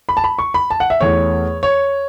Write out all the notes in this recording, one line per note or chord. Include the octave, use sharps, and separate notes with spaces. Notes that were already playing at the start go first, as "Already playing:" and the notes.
B5
A5
B5
C#6
B5
A5
F#5
E5
E2 E3 A3 C#5
C#5